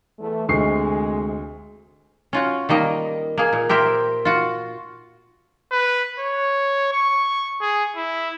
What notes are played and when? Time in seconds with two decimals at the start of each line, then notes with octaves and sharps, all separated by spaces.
0.19 E2 A3
0.49 D2 C3 G#3 C#6 C7
2.33 C#4 F4 F#4
2.69 D#3 G3 A#3 D#5
3.38 A#3 G#4
3.53 A#2
3.69 G4 A#4 C5 E5
4.25 F4 F#4
5.71 B4
6.19 C#5
6.92 C#6
7.61 G#4
7.96 E4